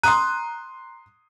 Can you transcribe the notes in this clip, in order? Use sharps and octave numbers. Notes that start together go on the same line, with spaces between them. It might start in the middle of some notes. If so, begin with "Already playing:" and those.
A#5 C6 D#6 F#6 D#7